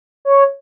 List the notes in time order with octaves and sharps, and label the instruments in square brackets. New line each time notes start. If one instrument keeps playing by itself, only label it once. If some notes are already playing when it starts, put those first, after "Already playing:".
[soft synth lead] C#5